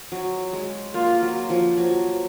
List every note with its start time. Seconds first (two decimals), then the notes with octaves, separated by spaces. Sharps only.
0.12 F#3
0.53 G#3
0.94 A#3 F4
1.22 F#3
1.50 F3
1.77 F#3